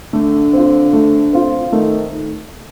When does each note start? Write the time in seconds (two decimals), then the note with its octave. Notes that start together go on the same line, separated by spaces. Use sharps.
0.13 D3 A3
0.53 C4 F4
0.93 A3
1.33 C4 F4
1.72 D#3 A3